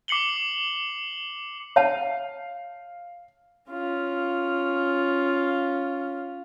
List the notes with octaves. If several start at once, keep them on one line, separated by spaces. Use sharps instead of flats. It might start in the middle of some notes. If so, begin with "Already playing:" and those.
D6 C7 C#7 F#7 G7
C#5 E5 F5 A5
C#4 F4